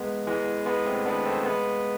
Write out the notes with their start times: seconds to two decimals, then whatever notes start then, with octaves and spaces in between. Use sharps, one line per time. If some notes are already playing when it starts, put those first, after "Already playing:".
Already playing: G#3 B3
0.27 E3 G#3
0.66 G#3 B3
0.86 A3 C4
1.06 B3 D4
1.25 A3 C4
1.44 G#3 B3